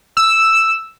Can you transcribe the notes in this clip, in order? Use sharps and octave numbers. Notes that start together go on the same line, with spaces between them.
E6